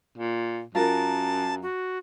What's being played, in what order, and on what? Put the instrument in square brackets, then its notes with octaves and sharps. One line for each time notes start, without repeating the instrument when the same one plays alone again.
[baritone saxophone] A#2
[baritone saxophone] F#2 [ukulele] F4 A#4 [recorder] A5
[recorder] F#4